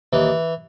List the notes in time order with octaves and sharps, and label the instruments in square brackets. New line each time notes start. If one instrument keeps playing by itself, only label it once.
[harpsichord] D#2 E3